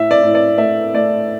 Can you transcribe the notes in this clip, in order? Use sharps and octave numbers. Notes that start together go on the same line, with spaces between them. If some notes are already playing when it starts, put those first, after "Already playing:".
Already playing: A2 E5
D5
A2
D5
A3 E5
A3 D5